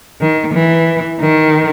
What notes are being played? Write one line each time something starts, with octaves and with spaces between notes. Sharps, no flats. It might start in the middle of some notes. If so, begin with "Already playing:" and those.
D#3
E3
D#3